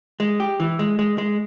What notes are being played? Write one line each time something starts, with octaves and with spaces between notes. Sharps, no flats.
G#3
G4
E3
G#3
G#3
G#3